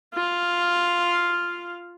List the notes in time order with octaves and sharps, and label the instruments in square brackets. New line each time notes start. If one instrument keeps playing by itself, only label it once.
[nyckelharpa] F4 F5